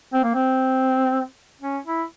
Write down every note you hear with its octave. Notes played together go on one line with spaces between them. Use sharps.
C4
A#3
C4
C#4
E4